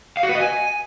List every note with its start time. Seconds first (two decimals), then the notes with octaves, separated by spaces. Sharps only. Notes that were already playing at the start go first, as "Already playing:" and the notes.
0.17 F5
0.23 F#4
0.29 B4
0.35 D#5
0.41 G#5